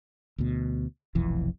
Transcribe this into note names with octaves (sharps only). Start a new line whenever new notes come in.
D2 B2
F1 B1 F2 E3